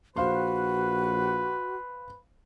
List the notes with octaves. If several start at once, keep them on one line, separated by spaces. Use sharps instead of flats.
A#1 F#4 B4 C5 F5 C6